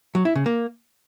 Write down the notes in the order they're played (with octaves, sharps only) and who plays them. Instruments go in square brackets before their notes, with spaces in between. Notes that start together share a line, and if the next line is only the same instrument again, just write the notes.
[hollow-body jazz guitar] F#3
E4
C#3
A#3